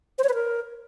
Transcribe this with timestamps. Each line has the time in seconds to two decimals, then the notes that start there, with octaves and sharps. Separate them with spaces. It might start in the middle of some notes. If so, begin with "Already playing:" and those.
0.18 C5
0.24 C#5
0.29 B4
0.34 A#4